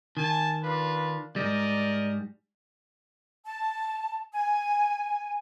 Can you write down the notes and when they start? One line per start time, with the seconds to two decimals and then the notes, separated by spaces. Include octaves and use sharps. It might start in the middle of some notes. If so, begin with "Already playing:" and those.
0.17 D#3 G#5 A5
0.64 D4 F4 B4
1.36 G#2 G3 A#4 D5 D#5
3.45 A5
4.32 G#5